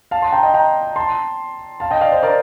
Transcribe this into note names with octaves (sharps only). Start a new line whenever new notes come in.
F5 A5
A5 C6
G5 A#5
D#5 G5
G5 A#5
A5 C6
F5 A5
D#5 G5
D5 F5
C5 D#5
A#4 D5